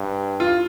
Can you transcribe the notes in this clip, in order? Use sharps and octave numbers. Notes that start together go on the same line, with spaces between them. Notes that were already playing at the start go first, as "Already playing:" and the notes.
Already playing: G2
F4